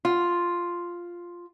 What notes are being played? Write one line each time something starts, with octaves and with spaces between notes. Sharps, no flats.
F4